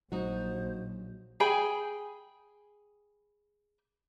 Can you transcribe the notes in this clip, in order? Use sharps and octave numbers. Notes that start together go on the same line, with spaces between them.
A#1 F#3 D#4 F#4 C5
G#4 G5 G#5 B5